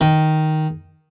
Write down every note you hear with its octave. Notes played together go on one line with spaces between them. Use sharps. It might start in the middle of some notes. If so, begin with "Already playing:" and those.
D#3